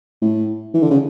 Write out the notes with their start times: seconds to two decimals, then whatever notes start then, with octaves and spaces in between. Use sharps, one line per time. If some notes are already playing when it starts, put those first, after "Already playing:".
0.22 A2
0.74 E3
0.82 D3
0.91 C#3